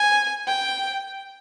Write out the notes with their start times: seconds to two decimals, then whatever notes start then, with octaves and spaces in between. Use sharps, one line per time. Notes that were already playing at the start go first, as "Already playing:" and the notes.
Already playing: G#5
0.48 G5